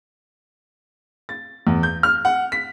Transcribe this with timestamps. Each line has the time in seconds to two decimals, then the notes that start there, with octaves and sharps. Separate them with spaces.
1.29 A6
1.67 E2
1.83 G6
2.03 F6
2.25 F#5
2.52 B6